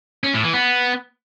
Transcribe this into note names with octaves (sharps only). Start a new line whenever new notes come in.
C#4
A2
E3
B3